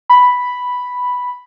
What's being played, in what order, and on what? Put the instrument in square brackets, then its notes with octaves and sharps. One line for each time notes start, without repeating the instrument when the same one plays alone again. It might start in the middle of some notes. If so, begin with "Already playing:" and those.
[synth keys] B5